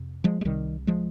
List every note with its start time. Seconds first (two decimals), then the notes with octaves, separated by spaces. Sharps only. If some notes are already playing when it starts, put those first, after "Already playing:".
Already playing: F2 C3
0.24 F3 G#3
0.41 G#3
0.45 C2 C3 D#3 G3
0.87 F3 G#3